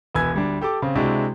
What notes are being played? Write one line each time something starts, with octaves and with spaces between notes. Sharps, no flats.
E1 B4 G#5 E6 G#6
D2 G3 D4
G4 A4 A5 D6
C#3 C4
C3 G#3 D4 E4 F#4